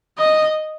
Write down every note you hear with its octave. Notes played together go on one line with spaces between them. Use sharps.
D#5